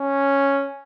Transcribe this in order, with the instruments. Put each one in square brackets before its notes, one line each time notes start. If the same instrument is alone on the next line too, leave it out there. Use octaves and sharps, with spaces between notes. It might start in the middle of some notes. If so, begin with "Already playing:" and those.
Already playing: [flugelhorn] C#4